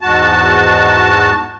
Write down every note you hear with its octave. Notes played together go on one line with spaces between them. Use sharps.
E2 G#2 F#4 A5